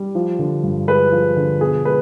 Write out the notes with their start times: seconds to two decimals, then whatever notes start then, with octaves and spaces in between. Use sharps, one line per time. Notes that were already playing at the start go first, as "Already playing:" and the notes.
Already playing: G3
0.15 F3
0.39 D3
0.63 G2
0.88 G#3 B4
1.12 F3
1.37 D3
1.61 B2 G#4
1.85 G#3 B4